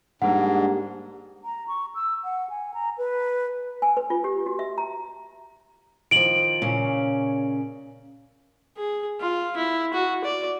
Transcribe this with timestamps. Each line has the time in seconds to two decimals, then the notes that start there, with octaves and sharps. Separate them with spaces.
0.22 G#2 G3 G#3 A#3 D4 G#4 F#5
1.44 A#5
1.68 C#6
1.95 E6
2.24 F#5
2.49 G#5
2.74 A#5
2.98 B4
3.82 G#5
3.97 B4
4.10 F4
4.24 G4
4.46 F#4
4.59 E5
4.78 A#5
6.11 D#3 F3 D7 F#7
6.62 A#2 C#3 C#4
8.77 G#4
9.21 F4
9.57 E4
9.94 F#4
10.24 D5